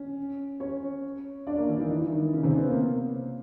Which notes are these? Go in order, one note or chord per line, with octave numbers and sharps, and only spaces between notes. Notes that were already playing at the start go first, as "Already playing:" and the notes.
Already playing: C#4
C#4 C#5
D4 D5
A#3 A#4
E3 E4
D#3 D#4
E3 E4
E4
D#3 D#4
C#3 C#4
C3 C4
B3
A#3